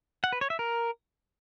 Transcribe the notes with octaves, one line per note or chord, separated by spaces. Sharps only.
F#5
B4
C#5
E5
A#4